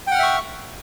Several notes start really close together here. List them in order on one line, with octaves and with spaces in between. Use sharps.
G5 F#5 F6 E5 C#6